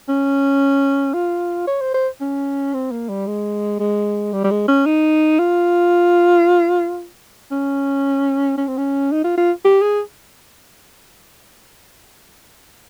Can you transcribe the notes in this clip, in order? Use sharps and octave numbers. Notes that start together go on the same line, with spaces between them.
C#4
F4
C#5
C5
C5
C#4
C4
A#3
G3
G#3
G#3
G3
G3
G#3
C#4
D#4
F4
C#4
C#4
C4
C#4
D#4
F4
F4
G4
G#4